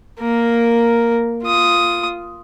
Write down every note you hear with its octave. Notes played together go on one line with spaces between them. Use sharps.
A#3 A#4
F4 D#6